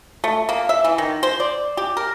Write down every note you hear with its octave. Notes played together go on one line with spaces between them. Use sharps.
A3
A#3
E5
E3
D#3
C5
D5
G4
A#4